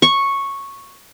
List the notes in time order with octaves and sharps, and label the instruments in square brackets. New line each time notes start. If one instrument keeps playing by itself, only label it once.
[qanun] C#6